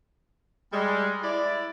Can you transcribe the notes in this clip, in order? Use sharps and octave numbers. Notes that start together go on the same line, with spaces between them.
G3 G#3
E4 D5